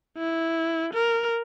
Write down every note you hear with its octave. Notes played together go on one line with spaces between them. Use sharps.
E4
A#4